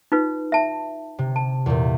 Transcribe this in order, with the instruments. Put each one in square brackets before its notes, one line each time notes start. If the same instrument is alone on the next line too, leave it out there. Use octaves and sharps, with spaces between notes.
[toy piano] D#4 F4 B4
E5 A5
[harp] C3
[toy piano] A5
[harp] E2 A#2